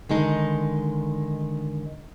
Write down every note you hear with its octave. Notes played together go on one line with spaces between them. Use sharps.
D3 D#3 G#3 D#4